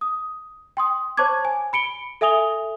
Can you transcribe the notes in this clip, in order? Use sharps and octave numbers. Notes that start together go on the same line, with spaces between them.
D#6
G5 C6 D#6
C5 C#5 A5 C#6 D6 G#6
G#5
B5 C#7 D7 G7
A4 E5 G#5 D#6 F7 G7